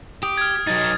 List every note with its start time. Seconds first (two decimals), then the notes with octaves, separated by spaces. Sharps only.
0.23 G4 D#6
0.38 F6 G#6
0.67 F#3 D#4 A6